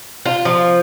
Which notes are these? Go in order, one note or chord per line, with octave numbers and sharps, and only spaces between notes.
F4
F3